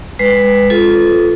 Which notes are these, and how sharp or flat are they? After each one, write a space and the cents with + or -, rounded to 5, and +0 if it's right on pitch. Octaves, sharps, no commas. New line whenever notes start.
G#3 -30 B4 +0
F4 +0 A4 -15